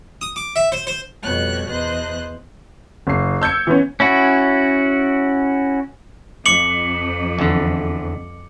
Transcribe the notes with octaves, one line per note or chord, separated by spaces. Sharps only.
D#6
D6
E5
C5
C5
F2 B2 G3 C#5 F#6
E2 C5 D#5 F#6
F#1 C7
E6 G6 G#6 C#7
E3 B3 C#4
C#4 E4 F#4
F2 D6 C#7 F#7
E2 D3